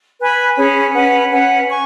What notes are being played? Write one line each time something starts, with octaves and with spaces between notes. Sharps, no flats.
B4 G#5 B5
C#4 G#4 C#5 B5
C#4 B4 F#5
C#4 B4 F#5
G#5 C#6